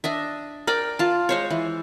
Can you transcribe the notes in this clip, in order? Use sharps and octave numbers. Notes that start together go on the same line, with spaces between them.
D4 D#5 E5
A#4 D5 G5
F4 A5
G#3 C5 C#5
E3